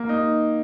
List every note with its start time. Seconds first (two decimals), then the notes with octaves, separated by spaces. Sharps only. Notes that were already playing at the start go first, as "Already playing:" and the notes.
Already playing: A#3
0.09 D#4